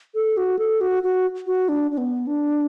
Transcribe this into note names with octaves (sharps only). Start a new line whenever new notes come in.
A4
F#4
A4
F#4
F#4
F#4
D4
D4
B3
D4